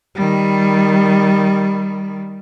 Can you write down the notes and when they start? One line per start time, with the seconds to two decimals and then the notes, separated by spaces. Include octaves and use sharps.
0.15 D#3 G3